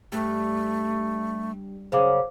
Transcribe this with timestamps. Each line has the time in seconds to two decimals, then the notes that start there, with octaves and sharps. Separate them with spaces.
0.12 G2 A3
1.92 F#2 C#3 C5 F5 D6